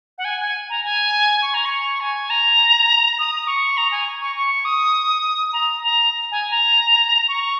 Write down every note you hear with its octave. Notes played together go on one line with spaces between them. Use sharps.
F#5
G#5
G#5
A#5
G#5
C#6
A#5
C#6
G#5
A#5
D#6
C#6
A#5
G#5
C#6
C#6
D#6
A#5
A#5
G#5
A#5
C#6